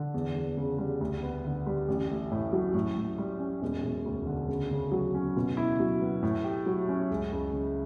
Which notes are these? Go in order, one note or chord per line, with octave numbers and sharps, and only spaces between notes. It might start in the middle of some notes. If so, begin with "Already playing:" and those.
Already playing: D3
E2
E2
C#3
G3
D2
B3
D3
G3
A1
A3
A2
F#3
A2
A2
G3
C#4
E1
E1
D2
D3
C#3
C#3
F#3
C#4
B2
E4
F#3
B3
A2
G4
F#3
C#4
C#2
C#2
C#3